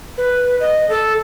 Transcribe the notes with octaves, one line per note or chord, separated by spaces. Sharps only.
B4
D#5
A4